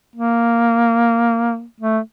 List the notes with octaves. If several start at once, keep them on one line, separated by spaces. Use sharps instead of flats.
A#3
A3